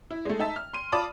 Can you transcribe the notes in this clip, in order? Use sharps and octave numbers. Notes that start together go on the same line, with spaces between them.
E4
G#3 A3
D#4 E5 A5
F6
C6 D#7
F4 D5 A5 B5 D6 D#6